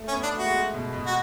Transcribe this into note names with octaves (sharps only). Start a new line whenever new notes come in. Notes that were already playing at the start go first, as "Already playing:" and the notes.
Already playing: A3
C#4
B3
D4
A3
F#4
G#3
A3
B2
B2
F#4